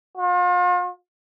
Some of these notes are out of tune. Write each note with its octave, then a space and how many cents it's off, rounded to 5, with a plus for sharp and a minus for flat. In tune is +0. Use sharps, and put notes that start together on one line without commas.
F4 +40